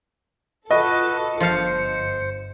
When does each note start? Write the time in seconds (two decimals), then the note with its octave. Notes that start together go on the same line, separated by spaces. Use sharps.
0.71 F4 F#4 A4 B4 D#5
1.40 G1 F3 C5 F5 C#7